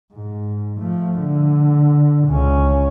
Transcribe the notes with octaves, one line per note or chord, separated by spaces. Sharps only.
G#2
F3 A3
D3
C#2 C#4